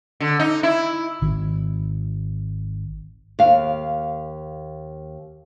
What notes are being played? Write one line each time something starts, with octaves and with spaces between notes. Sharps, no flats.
D3
D#4
E4
G#1 D#3
D#2 F5